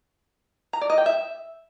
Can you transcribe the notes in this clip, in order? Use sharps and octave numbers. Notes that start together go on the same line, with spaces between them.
A#5
D5
D#5
G5
E5